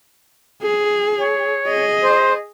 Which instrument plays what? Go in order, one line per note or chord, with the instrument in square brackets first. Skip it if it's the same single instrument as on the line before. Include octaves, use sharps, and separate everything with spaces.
[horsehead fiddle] G#4
[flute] C#5
[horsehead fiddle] G#4 D#5
[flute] C5